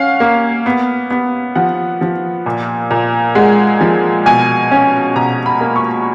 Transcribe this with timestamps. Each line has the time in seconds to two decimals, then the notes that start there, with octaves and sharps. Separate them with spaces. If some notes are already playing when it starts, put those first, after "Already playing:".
Already playing: C#4 F5 F#5
0.20 A#3
0.66 B3
1.11 B3
1.55 F3 F#5
2.01 F3
2.46 A#2
2.91 A#2
3.35 G#3 F#5
3.81 F3
4.26 B2 G#5
4.71 C#4
5.15 B2 A#5
5.46 B5
5.61 A#3
5.76 C#6